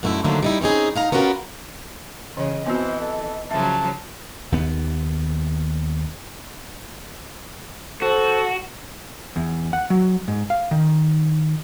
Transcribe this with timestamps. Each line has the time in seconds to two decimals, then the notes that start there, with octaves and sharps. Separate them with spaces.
0.03 F#2 D3 A3 D#4 E4
0.24 D3 D#3 F#3 A3 A#3 C4
0.43 G3 D#4 E4
0.61 C4 C#4 D#4 G#4
0.96 D#4 F5 A#5
1.12 B3 C#4 F4 F#4 G#4 A#4
2.37 C#3 E3 C#5 D#5
2.66 E3 B3 C4 F#4 C5
3.00 A4
3.51 C#3 F3 F#3 E5 A5
4.52 D#2 B3
8.02 F#4 A4 C5
9.36 E2
9.73 F#5
9.90 F#3
10.28 G#2
10.50 F5
10.71 D#3